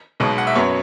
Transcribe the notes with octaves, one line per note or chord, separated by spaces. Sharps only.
B1 B2 G#3 B3
F#5
E5
F#2 F#3 B3 C#5